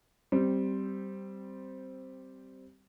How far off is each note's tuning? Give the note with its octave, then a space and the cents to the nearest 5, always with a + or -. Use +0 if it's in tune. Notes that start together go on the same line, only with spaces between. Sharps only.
G3 -10 C4 +0